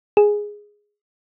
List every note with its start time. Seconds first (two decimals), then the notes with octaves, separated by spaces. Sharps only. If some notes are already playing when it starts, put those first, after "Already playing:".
0.17 G#4